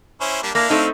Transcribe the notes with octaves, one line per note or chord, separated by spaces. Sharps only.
C#4 E4 C5
G3 A#3 D4
A#3 D4 E4 F5
A3 C4 D#4